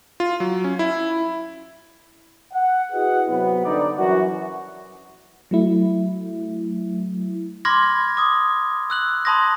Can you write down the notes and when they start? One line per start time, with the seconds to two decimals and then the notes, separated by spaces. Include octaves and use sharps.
0.20 F4
0.40 F#3
0.64 C#4
0.79 E4
2.53 F#5
2.92 E4 F#4 G#4 B4 D#5 F#5
3.28 C3 F#3 B3
3.64 G2 D3 D#4 D5
3.97 F#2 E3 F#4
5.51 F#3 A3 E4
7.65 B5 C6 D6 F6 G#6 A#6
8.17 D6 D#6
8.90 E6 F#6 F#7
9.25 A5 B5 C6 D#6 G#6 A#6